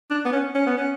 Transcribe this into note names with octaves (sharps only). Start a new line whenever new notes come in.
D4
B3
C#4
C#4
B3
C#4